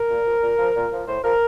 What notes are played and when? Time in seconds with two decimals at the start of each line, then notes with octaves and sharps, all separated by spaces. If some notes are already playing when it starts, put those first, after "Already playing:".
Already playing: A#4
0.10 A#2
0.26 F3
0.42 A#2
0.59 F3
0.75 A#2
0.92 F3
1.08 A2 C5
1.23 F3 A#4